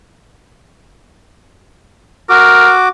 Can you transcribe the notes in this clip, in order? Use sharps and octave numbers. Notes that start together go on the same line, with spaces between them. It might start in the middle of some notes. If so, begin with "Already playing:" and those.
F#4 A#4 D6